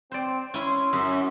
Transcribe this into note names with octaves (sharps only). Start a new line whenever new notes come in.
C4 C5 D5
C#4 E4 C6
F#2